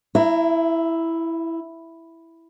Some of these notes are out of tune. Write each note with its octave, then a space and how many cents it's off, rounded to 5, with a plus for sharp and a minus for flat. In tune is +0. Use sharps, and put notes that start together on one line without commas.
E4 +0 E5 +40 A#5 +0